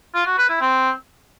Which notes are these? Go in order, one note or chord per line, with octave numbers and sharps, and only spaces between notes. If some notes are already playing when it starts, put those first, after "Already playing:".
F4
F#4
B4
E4
C4